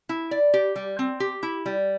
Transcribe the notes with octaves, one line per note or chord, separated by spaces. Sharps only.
E4
D5
G4
G3
C4
G4
E4
G3